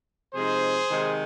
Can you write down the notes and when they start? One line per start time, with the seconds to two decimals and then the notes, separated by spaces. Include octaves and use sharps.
0.34 C3 F3 G#3 D#4 G#4 C5
0.90 C3 D#3 G#3 D#4